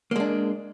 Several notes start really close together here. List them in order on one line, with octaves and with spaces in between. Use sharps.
A#3 G#3 D4